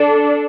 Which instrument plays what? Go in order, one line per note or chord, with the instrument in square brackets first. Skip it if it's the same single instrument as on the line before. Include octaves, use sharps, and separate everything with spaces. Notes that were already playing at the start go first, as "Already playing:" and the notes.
Already playing: [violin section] D4 A4